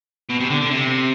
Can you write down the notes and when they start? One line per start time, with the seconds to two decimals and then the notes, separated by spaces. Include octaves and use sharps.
0.29 B2
0.40 C3
0.50 D3
0.61 D3
0.71 C3